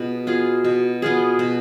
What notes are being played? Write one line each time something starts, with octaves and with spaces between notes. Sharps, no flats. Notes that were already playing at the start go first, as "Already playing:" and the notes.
Already playing: B2 B3 F4 G#4
B3 F4 G#4
B2
B3 F4 G#4
B2